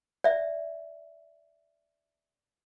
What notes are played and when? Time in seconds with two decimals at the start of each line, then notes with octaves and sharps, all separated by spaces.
0.24 D5 E5